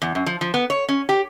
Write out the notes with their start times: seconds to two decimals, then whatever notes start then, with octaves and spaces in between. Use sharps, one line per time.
0.02 E2
0.15 F#2
0.26 F3
0.41 F3
0.54 B3
0.70 C#5
0.89 C#4
1.09 G4